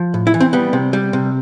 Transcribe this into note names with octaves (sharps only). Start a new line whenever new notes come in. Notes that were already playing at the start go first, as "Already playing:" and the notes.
Already playing: F3
A2
E4
E3
C4
G3 B3
C3
G3
C3